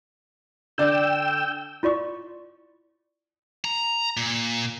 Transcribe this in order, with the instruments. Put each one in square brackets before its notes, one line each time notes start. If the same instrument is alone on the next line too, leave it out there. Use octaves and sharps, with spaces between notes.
[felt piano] D3 D5 [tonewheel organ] G5 E6
[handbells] E4 F4 D5 C#6
[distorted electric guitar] A#5
A#2